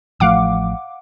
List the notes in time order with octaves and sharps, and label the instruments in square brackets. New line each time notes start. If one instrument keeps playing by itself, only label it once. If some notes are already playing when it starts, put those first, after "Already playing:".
[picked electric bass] A1 F3 A3 [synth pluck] F5 F#5 D6